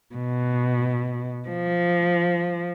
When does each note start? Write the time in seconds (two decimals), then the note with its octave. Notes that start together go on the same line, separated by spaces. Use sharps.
0.15 B2
1.48 F3